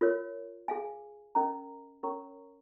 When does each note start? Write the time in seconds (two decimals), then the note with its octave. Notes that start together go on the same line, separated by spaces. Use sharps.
0.01 F4 A#4 C#5
0.68 G#4 F5 G#5
1.35 C#4 A#4 D#5 A#5
2.03 C#4 A#4 C#5 A#5 C#6